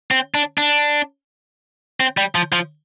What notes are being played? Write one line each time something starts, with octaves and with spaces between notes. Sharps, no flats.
C4
D4
D4
C4
G3
F3
F3